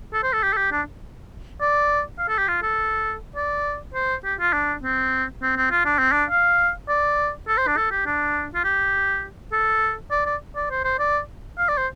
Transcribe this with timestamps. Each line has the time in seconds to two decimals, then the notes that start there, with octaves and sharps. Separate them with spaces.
0.13 A4
0.23 C5
0.33 A4
0.43 G4
0.53 A4
0.57 G4
0.72 D4
1.61 D5
2.19 F5
2.28 A4
2.38 G4
2.48 F4
2.62 A4
3.36 D5
3.94 C5
4.24 G4
4.40 F4
4.53 D4
4.83 C4
5.42 C4
5.57 C4
5.71 F4
5.85 D4
5.98 C4
6.12 D4
6.30 F5
6.88 D5
7.48 A4
7.57 C5
7.68 D4
7.77 A4
7.91 G4
8.06 D4
8.55 F4
8.64 G4
9.53 A4
10.11 D5
10.26 D5
10.56 D5
10.71 C5
10.85 C5
10.99 D5
11.58 F5
11.69 D5
11.78 C5